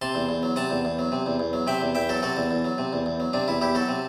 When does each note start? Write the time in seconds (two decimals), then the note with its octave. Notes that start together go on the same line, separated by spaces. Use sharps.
0.02 C3 A5 C6
0.15 E2
0.29 E2
0.43 F#3
0.56 C3 F#5 A5
0.70 E2
0.85 E2
0.99 F#3
1.12 C3
1.26 E2
1.40 E2
1.53 F#3
1.67 C3 E5 G5
1.81 E2
1.95 E2 E5 G5
2.09 F#3 F#4 A4
2.22 C3 F#4 A4
2.37 E2
2.51 E2
2.65 F#3
2.78 C3
2.93 E2
3.06 E2
3.20 F#3
3.33 C3 D4
3.48 E2 E4
3.61 E2 E4 G4
3.75 F#3 F#4 A4
3.89 C3